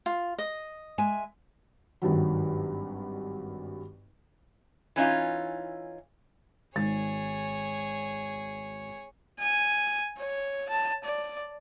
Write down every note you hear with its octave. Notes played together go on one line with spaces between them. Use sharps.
F4
D#5
G#3 E5 G#5
G#1 G2 D#3 F#3
E3 C#4 D#4 F4
G#1 G#4 C#5 A6
G#5
C#5
A5
D5